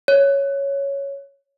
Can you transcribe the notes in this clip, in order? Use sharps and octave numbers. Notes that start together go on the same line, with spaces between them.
C#5